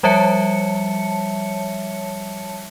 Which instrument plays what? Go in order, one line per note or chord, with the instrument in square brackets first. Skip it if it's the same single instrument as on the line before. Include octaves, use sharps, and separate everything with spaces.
[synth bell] F3 G3 C#5 E5 A5 C#7